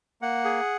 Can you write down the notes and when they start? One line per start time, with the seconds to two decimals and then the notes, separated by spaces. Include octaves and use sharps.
0.22 A#3 F#5
0.45 G#4